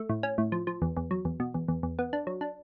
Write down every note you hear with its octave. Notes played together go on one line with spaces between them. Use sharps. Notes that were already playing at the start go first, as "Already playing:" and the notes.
Already playing: A3
A2
C#4
A2
F3
F3
E2
E2
F#3
E2
B2
E2
E2
E2
B3
D4
F#3
D4